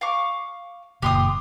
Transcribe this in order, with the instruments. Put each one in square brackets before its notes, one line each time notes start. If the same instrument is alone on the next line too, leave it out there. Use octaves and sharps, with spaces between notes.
[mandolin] F5 C#6 D6
[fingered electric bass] F#1 A#2 [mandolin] G4 C6 D#6